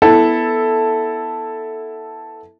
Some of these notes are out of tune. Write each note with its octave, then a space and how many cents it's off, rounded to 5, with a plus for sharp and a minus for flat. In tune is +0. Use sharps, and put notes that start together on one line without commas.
B3 +0 E4 -10 A4 +0